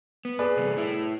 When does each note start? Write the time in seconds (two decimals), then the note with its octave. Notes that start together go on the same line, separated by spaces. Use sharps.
0.25 B3
0.39 G#4 B4 D5
0.57 G2 C3 A4
0.76 A2 E4